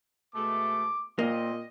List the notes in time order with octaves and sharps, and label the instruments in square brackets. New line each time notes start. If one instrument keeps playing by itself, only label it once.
[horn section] B2 G#3 A3 [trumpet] D6
[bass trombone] A#2 [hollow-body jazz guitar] A#3 [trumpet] C4 [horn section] D#5